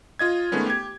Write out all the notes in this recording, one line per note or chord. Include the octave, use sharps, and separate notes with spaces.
F4 D#5 G#6
D#3 G#3 A3 B3 C#4
G4 G#6